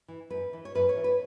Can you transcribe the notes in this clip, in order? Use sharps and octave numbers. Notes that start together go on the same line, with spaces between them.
E3
F#2 B4
E3
C#5
F#2 B4
C#5
E3
B4